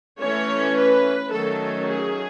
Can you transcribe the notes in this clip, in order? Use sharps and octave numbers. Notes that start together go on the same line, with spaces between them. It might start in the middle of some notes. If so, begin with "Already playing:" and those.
E3 A3 C#4 C#5
B4
D#3 F#3 A3 C#4 A4
G#4